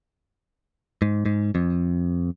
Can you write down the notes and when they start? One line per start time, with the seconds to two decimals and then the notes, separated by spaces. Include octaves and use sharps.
1.02 G#2
1.26 G#2
1.55 F2